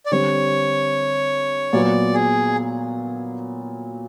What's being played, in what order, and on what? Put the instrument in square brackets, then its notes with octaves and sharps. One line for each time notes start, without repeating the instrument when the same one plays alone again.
[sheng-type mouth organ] D5
[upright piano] D3 G3 C4 [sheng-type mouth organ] C#5
[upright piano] A#2 F#3 B3 [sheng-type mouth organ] D5
[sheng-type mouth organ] G#4